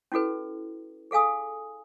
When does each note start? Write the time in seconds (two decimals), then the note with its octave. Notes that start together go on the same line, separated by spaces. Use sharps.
0.12 C#4 E4 F#4 A4 B4
1.11 G#4 A4 F5 G#5 D#6